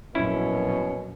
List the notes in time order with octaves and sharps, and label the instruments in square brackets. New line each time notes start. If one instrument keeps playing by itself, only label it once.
[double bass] A#1 F#2 [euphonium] B2 [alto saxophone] C#4 [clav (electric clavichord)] E4